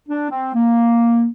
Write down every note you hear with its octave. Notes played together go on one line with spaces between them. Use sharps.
D4
C4
A#3